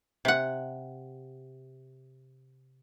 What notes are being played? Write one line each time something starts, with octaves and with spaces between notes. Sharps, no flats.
C3 F#5